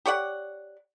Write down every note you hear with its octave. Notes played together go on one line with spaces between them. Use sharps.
G4 C#5 D5 F#5